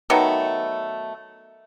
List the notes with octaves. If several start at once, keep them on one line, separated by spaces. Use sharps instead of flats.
D#3 F#3 A3 B3